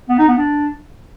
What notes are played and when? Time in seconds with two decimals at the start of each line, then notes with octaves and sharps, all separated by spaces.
0.09 B3
0.18 D#4
0.28 B3
0.37 D4